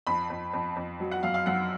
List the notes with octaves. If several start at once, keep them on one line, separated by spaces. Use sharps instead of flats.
F2 B5
F2
F2
F2
F#3
F#5
F#2 F5
F5
F#2 F#5